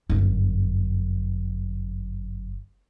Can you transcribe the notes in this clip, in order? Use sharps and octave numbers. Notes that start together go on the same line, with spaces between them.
G1 F#2